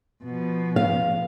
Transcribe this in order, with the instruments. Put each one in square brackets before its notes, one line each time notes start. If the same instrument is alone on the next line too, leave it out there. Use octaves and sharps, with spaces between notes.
[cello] B2 F3
[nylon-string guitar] F5